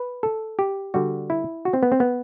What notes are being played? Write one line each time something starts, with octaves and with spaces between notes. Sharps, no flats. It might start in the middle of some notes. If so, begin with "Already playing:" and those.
Already playing: B4
A4
G4
D3 G3 F#4
E4
F#4
C4
B3
C4
B3